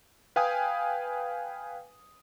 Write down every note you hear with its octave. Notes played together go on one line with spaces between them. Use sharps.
B4 F5 G5 G#5 D#6